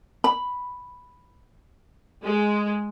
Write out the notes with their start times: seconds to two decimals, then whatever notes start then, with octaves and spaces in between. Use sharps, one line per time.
0.24 B5
2.24 G#3